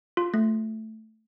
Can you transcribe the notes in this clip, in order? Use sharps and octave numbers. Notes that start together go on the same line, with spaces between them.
F4
A3